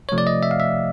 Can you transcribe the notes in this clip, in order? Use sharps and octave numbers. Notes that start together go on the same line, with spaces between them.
C3 F3 A3 C#5
D5
D#5
E5
F5
E5